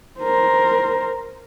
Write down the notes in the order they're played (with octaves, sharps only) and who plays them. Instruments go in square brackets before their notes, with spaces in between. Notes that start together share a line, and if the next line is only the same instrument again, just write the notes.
[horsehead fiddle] A#4 C5